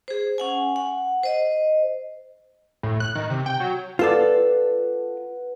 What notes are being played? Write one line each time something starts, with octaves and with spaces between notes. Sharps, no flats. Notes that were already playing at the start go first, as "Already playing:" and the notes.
G#4 C5
C#4 F#5 G#5
F#5
C5 D#5
A2
F#6
D#3
C3
G5
F#3
F4 A4 B4 D5 F#5